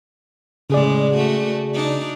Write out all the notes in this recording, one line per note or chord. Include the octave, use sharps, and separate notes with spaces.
A2 C#3 G#3 G#4 D5
A3 F#4
D4 D#4